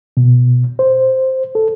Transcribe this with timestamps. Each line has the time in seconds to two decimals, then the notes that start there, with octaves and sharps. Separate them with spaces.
0.17 B2
0.79 C5
1.55 A4